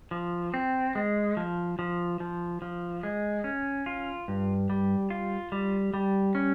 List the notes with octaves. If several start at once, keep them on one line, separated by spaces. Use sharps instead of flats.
F3
C4
G#3
F3
F3
F3
F3
G#3
C#4
F4
G2
G3
F4
G3
G3
C#4